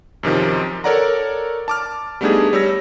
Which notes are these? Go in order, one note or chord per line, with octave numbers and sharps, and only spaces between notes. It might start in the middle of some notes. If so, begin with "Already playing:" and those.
F#2 C3 D#3 F3
A4 A#4 C#5 D5 F#5 A#5
A5 D6 F6
G3 A3 B3 D4 D#4 G#4
G3 C#5 E6 A#6